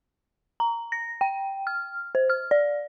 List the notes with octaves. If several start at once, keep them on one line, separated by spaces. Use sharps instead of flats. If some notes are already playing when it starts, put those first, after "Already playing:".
A#5
A#6
G5
F6
C5
F6
D5